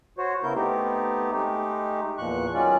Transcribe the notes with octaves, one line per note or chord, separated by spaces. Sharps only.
F#4 C5 C#5
C#3 B3 E4 A#4 G6
A3 B3 C4 D#4 G4
G#3 A3 D#4 G4
E2 A#2 F3 C#6 F#6
D#3 F#3 G#3 C#4 F4 D5